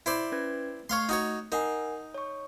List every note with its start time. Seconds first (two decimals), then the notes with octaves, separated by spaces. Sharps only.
0.06 E4 C5 D5
0.32 C#4 B4 G#6
0.89 A3 C#5 F5 C6 C#6
1.09 D#4 F#4 C#5
1.52 D#4 A#4 F#5 G#5
2.14 C#5 C#6